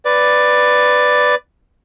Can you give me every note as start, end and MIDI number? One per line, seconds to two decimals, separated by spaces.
0.05 1.35 71
0.05 1.35 74